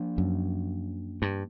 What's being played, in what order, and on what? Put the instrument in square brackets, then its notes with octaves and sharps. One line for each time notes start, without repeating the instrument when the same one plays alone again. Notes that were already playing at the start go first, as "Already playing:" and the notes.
Already playing: [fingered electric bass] F3 A#3 D4
[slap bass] F#2
G2